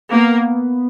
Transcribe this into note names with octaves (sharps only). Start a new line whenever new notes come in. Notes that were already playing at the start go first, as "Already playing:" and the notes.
A#3 B3